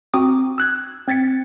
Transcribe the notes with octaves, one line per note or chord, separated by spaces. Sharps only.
C4 F#4 A#5 D6 D#6
E6 F#6 G#6
C4 G#6 A6 B6 C#7